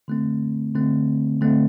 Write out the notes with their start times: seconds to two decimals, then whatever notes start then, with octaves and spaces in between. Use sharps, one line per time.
0.08 D3 A3 C4
0.75 D3 A3 C4
1.41 D3 A3 C4